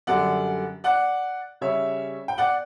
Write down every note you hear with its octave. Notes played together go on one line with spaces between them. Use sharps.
F#2 D3 G3 D5 F#5
D5 F#5
C#3 G3 C#4 C#5 E5
G5
D5 F#5